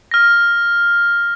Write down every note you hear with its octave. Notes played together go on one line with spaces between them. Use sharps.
F6 A#6